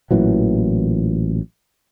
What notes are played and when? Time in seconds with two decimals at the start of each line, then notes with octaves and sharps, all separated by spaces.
0.11 A1 A#2 E3 F#3